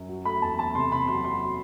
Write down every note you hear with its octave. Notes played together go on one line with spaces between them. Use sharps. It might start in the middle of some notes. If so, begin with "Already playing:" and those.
Already playing: F#2
F#3
A3 B5
E2 A5
A3 A5
C3 C6
C3 B5
F#3 C6
F#3 C6